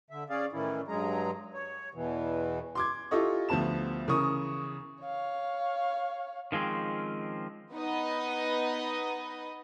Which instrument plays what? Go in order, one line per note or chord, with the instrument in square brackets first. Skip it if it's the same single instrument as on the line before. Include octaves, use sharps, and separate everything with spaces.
[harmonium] D3 E5
C#4 G#4 D5 F5
A2 D#3 E3 C#4 E4
G2 F#3 G#3 G#4 A#5
C#5
E2 B2 E3
[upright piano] C6 D6 G#6
E4 F4 G4 A4 D#5 C#6
D2 F3 B3 A5 E7
C#3 E3 A#4 C#6 D#6
[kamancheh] C#5 F5
[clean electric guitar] D#3 F3 G#3 C4 C#4
[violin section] B3 D#4 B4 D#5